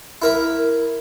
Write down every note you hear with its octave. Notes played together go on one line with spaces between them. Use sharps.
E4 A#4 E5